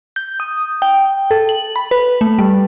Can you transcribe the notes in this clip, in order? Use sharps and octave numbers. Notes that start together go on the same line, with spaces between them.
G6
D#6
G5
A4
F#7
B5
B4
A3
G3